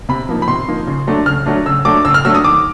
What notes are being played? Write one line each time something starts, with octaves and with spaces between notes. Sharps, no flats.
C3 B5
F3 A#3 D#4
B5
C3 C6
F3 A#3 D#4
C#3
F#3 A3 D4
C#3 F6
F#3 A3 D4
C#3 E6
F#3 A3 D4 D6
C#3 E6
F6
F#3 A3 D4 E6
D#6
D#3 D6